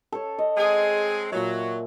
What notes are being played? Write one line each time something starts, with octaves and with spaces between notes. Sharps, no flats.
A4 C#5
D#5
G#3 C4 G#4
A#2 F#3 E5